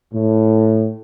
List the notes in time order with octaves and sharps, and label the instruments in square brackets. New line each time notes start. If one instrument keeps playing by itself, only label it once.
[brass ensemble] A2